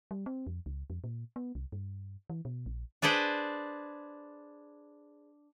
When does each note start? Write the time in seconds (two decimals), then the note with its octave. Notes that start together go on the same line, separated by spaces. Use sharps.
0.11 G3
0.26 C4
0.47 F2
0.66 C#2
0.90 F2
1.04 A#2
1.36 B3
1.55 C2
1.72 G2
2.30 E3
2.45 B2
2.66 A#1
3.02 D4 G#4 B4 C5 D5